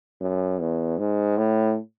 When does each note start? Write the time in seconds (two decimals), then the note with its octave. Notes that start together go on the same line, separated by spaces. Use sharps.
0.21 F#2
0.60 E2
0.98 G#2
1.38 A2